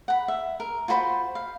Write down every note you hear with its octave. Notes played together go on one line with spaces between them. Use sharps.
F#5 B5
E5
A#4
F4 F#4 C5 B5
F5